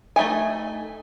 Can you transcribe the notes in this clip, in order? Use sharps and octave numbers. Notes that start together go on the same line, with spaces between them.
A3 D#4 E5 G#5